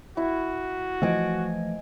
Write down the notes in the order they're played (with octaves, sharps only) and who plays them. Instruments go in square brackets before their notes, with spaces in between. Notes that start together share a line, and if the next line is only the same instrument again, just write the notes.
[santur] E4 [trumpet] F#4
[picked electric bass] E3 F3 A3 [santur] D#5 G#5 D6